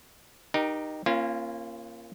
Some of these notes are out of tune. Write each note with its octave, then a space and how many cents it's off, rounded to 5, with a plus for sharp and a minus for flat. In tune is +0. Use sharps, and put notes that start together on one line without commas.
D#4 -15 G4 +0 A#4 +20
A#3 +5 C#4 -30 F4 -30